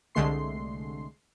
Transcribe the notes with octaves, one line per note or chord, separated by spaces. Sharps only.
C2 D3 G#3 A3 C6 C7